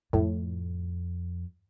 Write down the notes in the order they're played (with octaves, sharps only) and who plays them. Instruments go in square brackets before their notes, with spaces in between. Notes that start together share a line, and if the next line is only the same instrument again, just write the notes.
[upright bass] F2 [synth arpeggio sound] A2